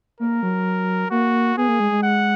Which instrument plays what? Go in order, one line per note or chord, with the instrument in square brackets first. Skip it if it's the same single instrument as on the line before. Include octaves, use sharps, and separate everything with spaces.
[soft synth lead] A#3 [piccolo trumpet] A#4
[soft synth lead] F#3
[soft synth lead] A#3 [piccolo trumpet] F#4
[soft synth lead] B3 [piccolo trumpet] G#4
[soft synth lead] A#3
G#3
G#3
[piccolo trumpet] F#5